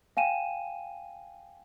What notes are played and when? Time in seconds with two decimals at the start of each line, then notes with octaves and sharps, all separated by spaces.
0.17 F5 G5 G#5 D#7 E7